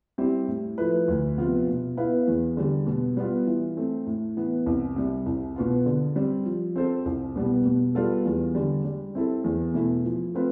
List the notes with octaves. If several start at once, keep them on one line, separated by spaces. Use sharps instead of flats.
G3 C4 E4 G4
A2
F3 A3 E4 B4
D2
C3 F3 B3 F4
B2
B3 E4 B4 F5
E2
D3 G3
B2
G3 B3 F4
E3
A3 C4
A2
E3 B3
C2
C3 G3
C2
B2 B3 F4
D3
G3 C4
F3
C4 F4 A4 C5
C2
B2 G3 B3
B2
G3 B3 F4 A4
E2
D3 G3
G3
C4 E4 A4
E2
B2 A3 E4
F3
A3 C4 F4 B4